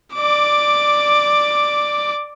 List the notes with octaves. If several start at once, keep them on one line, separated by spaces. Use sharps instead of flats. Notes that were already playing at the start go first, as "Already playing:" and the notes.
D5 D6